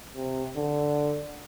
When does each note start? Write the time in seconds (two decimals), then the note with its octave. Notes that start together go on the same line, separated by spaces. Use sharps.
0.15 C3
0.57 D3